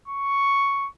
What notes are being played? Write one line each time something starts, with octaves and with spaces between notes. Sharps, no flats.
C#6